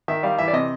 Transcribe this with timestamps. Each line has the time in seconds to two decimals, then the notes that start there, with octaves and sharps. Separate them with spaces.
0.08 D#3 E5
0.23 G3 F5
0.38 E3 E5
0.48 D5
0.53 C3 D#5